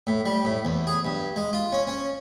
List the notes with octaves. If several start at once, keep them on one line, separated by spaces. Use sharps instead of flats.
A2
G3
A2
E2
G#4
G2
G#3
F4
C#4
C#4